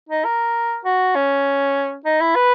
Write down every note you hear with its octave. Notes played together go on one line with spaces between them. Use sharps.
D#4
A#4
F#4
C#4
D#4
E4
B4